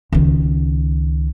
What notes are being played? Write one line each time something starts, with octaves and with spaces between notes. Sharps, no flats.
C#2 D#3